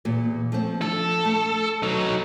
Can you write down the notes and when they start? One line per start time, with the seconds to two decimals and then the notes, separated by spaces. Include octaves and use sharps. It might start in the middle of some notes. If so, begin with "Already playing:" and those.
0.05 E2 A#2
0.52 F3 A3 C4
0.82 F3 D4 A4
1.25 A3
1.83 F#3 D#4